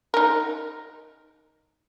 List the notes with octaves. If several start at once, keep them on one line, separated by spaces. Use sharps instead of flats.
D#4 A#4